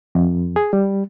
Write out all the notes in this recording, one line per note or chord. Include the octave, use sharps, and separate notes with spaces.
F2
G#4
G3